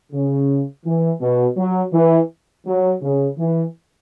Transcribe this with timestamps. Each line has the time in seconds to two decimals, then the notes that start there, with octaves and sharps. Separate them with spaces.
0.13 C#3
0.85 E3
1.21 B2
1.57 F#3
1.93 E3
2.66 F#3
3.02 C#3
3.38 E3